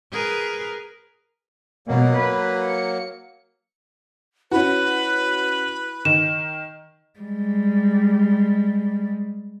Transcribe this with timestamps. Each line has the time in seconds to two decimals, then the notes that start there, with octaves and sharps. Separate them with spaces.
0.12 G#4 A#4 B4
1.88 B2 F#3 A#3
2.17 B4
2.64 C#7
4.52 C#4 E4 F#4 B4
6.05 D#3 E7
7.20 G3 G#3